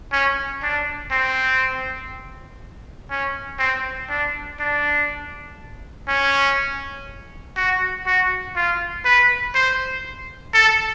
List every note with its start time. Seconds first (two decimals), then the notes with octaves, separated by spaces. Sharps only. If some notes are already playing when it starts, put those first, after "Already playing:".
0.12 C#4
0.63 D4
1.11 C4
3.10 C#4
3.59 C4
4.09 D4
4.60 D4
6.08 C#4
7.56 F#4
8.06 F#4
8.56 F4
9.05 B4
9.55 C5
10.54 A4